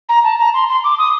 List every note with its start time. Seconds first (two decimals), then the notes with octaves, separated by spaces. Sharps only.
0.09 A#5
0.24 A5
0.39 A#5
0.54 C6
0.69 C6
0.84 D6
0.99 D#6